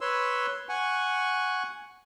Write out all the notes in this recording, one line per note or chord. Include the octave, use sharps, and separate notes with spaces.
B4 C#5 C6 E6
F#5 G#5 C#6